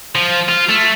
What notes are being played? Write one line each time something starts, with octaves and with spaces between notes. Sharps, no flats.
F3
F4
A3